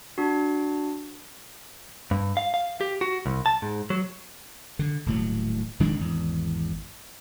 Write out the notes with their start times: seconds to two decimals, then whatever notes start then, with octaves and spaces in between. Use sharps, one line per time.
0.18 D4 F#4
2.11 G2
2.37 F5
2.54 F5
2.81 G4
3.01 F#4
3.26 C2
3.46 A5
3.62 G#2
3.90 F#3
4.79 D3
5.06 D#1 A2 F#3
5.80 D#1 D#3 G#3 D4
5.99 G#1 E2